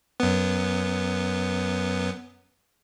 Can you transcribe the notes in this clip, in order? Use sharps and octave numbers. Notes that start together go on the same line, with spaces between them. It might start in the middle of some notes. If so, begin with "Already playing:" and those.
F#2 B3